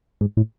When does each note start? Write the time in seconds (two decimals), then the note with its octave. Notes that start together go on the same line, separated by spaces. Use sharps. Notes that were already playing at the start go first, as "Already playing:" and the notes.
0.21 G#2
0.37 A2